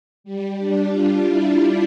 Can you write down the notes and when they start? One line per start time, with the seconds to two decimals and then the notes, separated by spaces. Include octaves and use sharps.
0.24 G3
0.59 D4
0.92 F4
1.26 E4